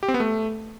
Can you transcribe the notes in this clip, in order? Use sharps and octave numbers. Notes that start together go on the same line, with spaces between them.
G4
C4
B3
A3